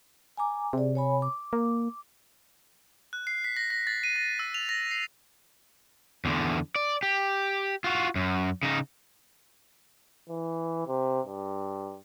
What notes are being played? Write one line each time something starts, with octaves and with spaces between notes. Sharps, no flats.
G#5 A#5 D6
C3 G#4 D5
C#5 G#5 B5
D6
A#3
F#6
C7
B6
A#6
A#6
A6
D#7
A#6
E6
F7
A#6
C7
E2 D3
D5
G4
F4 F#4
F#2
C#3 D#4
E3
C3
G2